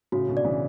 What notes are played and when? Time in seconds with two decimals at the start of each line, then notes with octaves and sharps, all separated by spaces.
0.12 A2 C#3 F#4
0.29 B2 D3
0.37 D5
0.45 C#3 E3